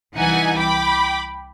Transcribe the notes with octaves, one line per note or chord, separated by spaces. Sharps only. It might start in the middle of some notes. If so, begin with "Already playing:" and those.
C2 E3 D#4 F#5 G#5
G5 B5 D6